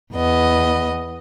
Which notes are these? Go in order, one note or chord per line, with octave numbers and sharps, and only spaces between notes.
E2 B3 D#5